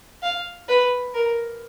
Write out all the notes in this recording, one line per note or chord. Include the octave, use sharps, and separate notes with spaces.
F5
B4
A#4